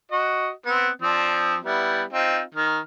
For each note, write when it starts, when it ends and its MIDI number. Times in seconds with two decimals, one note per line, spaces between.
0.11 0.50 66
0.11 0.50 75
0.66 0.89 59
0.66 0.89 60
1.02 1.58 53
1.02 1.58 60
1.02 1.58 62
1.63 2.03 55
1.63 2.03 59
1.63 2.03 64
2.13 2.41 60
2.13 2.41 63
2.13 2.41 65
2.55 2.79 51
2.55 2.79 89